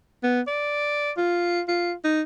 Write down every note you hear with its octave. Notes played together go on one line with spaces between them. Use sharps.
B3
D5
F4
F4
D#4